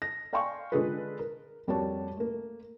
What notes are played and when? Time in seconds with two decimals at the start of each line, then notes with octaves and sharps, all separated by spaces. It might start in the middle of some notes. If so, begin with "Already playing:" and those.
0.02 A#6
0.33 D5 F5 G5 G#5 C6 C#6
0.72 D3 G#3 F4 G#4 A4 B4
1.19 A#4
1.68 F2 G3 A#3 F#4 C#5 A5
2.17 A3 A#3